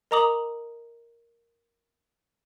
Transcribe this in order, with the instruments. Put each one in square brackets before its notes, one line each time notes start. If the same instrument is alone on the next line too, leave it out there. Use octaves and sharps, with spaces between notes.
[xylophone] A#4 D#5 A#5 D6 D#6 F#7